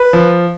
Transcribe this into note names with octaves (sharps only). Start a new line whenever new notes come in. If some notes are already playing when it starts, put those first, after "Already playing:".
Already playing: B4
F3